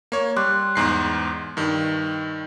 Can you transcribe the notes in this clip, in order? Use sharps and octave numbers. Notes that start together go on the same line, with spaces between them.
A#3 C#5
G3 C6 D6 F#6
E2 G#2 C7
G2 D#3